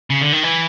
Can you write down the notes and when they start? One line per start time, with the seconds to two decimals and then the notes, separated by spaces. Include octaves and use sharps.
0.10 C#3
0.21 D3
0.33 D#3
0.43 E3